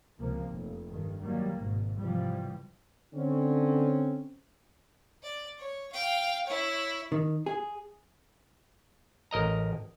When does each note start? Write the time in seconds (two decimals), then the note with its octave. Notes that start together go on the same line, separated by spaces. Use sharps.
0.19 C#2 C3 F3 A#3
0.50 F1
0.88 G2 D#3
1.22 D#3 F#3 G3 A#3
1.58 G#1 G#2 B2
1.99 G#2 C3 E3 F3 G3
3.14 D3 C4 C#4
5.23 D5
5.58 C#5
5.92 F5 G5
6.47 E4 C#5
7.12 D#3
7.46 G#4
9.31 A1 A#4 D#5 A#5